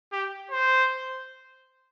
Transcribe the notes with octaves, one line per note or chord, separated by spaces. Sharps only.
G4
C5